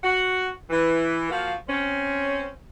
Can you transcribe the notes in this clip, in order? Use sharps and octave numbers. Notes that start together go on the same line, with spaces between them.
F#4
E3
F3 A#3 F#4 F5
C4 C#4